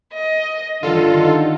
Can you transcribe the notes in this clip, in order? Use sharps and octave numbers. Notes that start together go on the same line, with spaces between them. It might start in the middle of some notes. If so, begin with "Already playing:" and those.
D#5
G2 D3 D#3 F4 A4
D#4